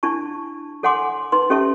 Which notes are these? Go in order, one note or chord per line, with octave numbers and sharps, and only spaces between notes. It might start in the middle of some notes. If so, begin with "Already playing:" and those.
D4 E4 A5 C#6
A4 C#5 F#5 G#5 C6 D6
D#4 B4 C6
C#4 G4 A4 C#5 E5 A5